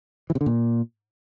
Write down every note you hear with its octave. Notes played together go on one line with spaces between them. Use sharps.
E3
C3
D3
A#2